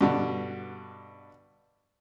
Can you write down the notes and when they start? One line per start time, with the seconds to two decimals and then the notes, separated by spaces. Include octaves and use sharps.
0.01 G2 B2 D3